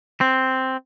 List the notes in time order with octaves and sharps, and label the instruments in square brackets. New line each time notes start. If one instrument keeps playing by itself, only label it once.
[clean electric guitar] C4